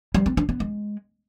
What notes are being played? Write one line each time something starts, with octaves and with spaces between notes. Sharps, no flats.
G3
C4
D4
B3
G#3